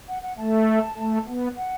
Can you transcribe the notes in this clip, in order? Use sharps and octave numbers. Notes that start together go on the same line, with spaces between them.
F#5
F#5
A3 A5
A3
B3
F#5